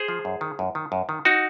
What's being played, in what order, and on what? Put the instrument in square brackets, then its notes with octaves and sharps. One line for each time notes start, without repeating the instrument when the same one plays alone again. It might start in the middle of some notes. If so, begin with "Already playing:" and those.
Already playing: [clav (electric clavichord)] G#4 C5
F3
F#2
D#3
F#2
D#3
F#2
D#3
D#4 F#4